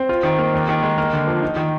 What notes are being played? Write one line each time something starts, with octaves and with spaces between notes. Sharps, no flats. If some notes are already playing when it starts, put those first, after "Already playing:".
Already playing: C4
F4
D#3
A#3
D#2
D#3
G#3
A#3
D3
F3
D#4
D#3